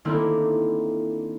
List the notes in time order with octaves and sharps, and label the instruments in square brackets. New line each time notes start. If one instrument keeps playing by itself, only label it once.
[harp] D#3 A3 A#3 C4 D4 E4